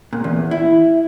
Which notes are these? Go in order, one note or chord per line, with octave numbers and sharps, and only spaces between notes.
A#2
E2
E4